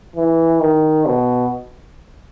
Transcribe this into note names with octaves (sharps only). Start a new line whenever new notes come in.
E3
D#3
B2